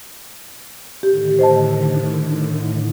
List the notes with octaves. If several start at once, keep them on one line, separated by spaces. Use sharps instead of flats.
A2 D3 D#3 G4
C5 D#5 A5